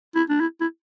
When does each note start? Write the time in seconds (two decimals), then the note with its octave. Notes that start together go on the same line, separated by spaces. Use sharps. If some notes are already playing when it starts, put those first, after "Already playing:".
0.15 E4
0.30 D4
0.41 E4
0.61 E4